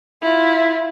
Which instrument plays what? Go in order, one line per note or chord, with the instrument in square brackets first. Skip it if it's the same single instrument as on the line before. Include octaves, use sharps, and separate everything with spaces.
[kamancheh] E4 F4